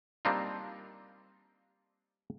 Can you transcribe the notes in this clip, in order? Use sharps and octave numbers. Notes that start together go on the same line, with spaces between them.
G3 A#3 C4 D4 D#4 F4